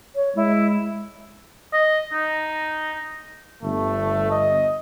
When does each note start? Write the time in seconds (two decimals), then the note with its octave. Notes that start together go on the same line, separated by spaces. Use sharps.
0.16 C#5
0.35 G#3 E4
1.73 D#5
2.12 D#4
3.63 G1 A3
4.31 D#5